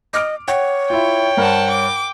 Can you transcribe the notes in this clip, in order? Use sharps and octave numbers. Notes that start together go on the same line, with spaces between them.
D#5 D6 F6 D7
C#5 F#5 G5
E4 F4 G5
G2 A#4 C5 F#5 A5
D6